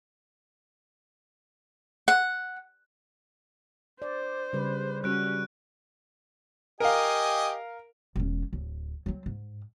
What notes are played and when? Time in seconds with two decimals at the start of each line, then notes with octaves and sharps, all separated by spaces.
2.08 F#5
4.02 C5 D5
4.53 C#3 G3 B4
5.04 G3 C#4 F#4 F#6 D7
6.80 G4 A#4 D#5 F5 G#5
8.16 E1 C#4
8.53 D1
9.06 F#3 C4
9.26 G#2